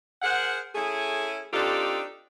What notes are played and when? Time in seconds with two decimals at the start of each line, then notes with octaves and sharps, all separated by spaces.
0.22 G#4 A#4 C5 F#5
0.74 A3 C#4 E4 G#4
1.51 C4 D4 D#4 F4 G4 A4